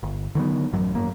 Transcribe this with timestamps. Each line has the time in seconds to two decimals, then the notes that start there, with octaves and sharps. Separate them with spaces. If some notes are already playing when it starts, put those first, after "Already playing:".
0.03 G1
0.35 D3 D#3 F#3 B3
0.73 A1 F#2 F#3
0.94 G#1 F#2 A#3